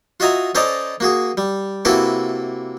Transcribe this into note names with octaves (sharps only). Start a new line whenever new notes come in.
F4 F#4 D#5 E5 G#5 A#5
C#4 A4 C5 D5 D#5 A#5
A#3 F#4 G#4
G3
C3 A#3 E4 F#4 A4 B4